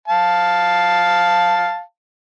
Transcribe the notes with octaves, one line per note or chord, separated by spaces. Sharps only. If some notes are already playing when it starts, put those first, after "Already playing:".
F5 A5